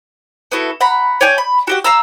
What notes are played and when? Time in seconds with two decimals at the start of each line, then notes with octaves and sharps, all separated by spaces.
0.52 B3 E4 F#4 A4
0.81 F#5 A#5 B5
1.21 C#5 D5 G5 G#5
1.38 B5
1.67 F#4 G4 F#5
1.84 F5 A#5 E6